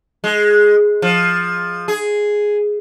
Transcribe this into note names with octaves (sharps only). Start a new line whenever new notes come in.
G#3
F3
G#4